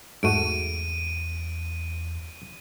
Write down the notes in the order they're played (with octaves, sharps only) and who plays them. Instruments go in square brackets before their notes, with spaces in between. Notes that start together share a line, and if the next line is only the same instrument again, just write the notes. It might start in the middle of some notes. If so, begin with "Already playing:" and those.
[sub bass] E2 [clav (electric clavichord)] G#2 A3 F#4 [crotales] D7 D#7